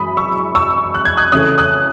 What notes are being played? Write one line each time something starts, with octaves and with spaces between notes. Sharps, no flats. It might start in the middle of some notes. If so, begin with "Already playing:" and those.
Already playing: F#2 E3 G#3 B5 D#6
C#6 E6
C#6 E6
F#6
G#6
D#6 F#6
C#3 E3 A3 C#4 D#6 F#6
D#6 F#6